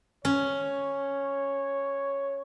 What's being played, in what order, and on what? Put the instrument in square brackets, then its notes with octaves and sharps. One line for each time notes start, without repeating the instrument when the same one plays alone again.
[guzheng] C#4 [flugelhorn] C#5